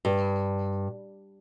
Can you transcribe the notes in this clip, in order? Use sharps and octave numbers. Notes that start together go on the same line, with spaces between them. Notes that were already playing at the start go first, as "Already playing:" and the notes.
G2